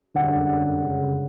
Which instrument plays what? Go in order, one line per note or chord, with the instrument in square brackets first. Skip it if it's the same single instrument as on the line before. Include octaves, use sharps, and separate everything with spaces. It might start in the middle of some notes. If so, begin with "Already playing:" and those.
[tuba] D3 [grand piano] F#5
[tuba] C#3